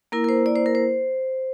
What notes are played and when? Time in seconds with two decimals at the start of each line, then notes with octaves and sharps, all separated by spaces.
0.12 A#3 E4 A#4
0.24 A#4
0.29 C5
0.46 D5
0.56 C5
0.66 A#4
0.75 C5